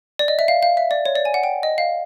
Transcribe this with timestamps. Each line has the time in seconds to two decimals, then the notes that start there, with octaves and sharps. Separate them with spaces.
0.19 D5
0.28 D#5
0.39 E5
0.48 F5
0.63 F5
0.77 E5
0.91 D5
1.06 C#5
1.15 D5
1.25 G#5
1.34 F#5
1.43 G5
1.63 D#5
1.78 F5